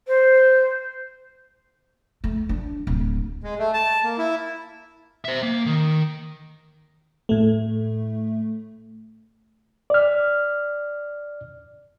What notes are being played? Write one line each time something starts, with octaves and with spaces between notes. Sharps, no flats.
C5
A3
D4
D1
G#3
A3
A5
A#3
E4
C5 E5
A#3
D#3
A2 A3
D5 F6